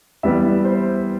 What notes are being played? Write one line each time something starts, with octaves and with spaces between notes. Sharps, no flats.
E3 G3 B3 E5
C5